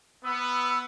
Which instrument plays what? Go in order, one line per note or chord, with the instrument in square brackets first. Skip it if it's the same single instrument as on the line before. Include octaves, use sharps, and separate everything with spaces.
[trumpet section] B3 [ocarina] E6